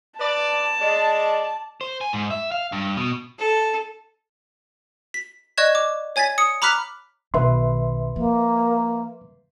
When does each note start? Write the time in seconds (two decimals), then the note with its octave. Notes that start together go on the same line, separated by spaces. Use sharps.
0.20 B4 D5 A5
0.80 G#3 D5
1.81 C5
2.01 G#5
2.13 G#2
2.31 E5
2.52 F5
2.72 G2
2.97 B2
3.39 A4
5.14 B6
5.57 D5 D#5 C#6 F#6 G#6 E7
5.75 D6
6.16 C#5 G#5 G#6 A6 B6
6.38 D#6 C#7
6.62 A#5 B5 D6 F6 F#6 B6
7.34 B1 D#3 B4 E5 C6
8.16 F3 A#3